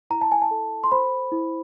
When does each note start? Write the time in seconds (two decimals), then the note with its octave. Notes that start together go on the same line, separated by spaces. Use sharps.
0.10 E4 A#5
0.21 A5
0.32 G#5
0.42 A5
0.51 A4
0.84 C6
0.92 C5 B5
1.32 E4